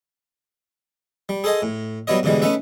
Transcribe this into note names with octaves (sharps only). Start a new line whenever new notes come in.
G3
G#4 A4 C5 D#5 G#5
A2
F#3 G3 B3 E4 C#5 D#5
G#2 B2 D3 E3 G3 G#3
A3 C#4 D#4 B4 E5